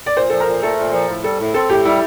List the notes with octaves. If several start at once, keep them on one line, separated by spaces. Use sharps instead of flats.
D5
A#2 C5
F3 A4
A#4
A#2
A3 A4
A#2
F3
A2
G3 A4
A2
C4 A4
A2 G4
G3 E4